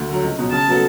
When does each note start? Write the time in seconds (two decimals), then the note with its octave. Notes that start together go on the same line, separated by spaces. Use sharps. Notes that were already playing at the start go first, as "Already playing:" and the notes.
Already playing: D2
0.09 D3 F#3
0.23 C#2
0.39 B2 F#3
0.52 C#3 A5
0.68 F#3 B3 F#4 A4